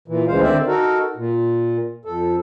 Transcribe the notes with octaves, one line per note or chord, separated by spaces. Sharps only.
A#2 E3
D2 C#3 E3 G#3 C5 F5
D3 D#3 C4 C5 D5 E5
D#4 F#4 A4 A#4
A#2
F2 A4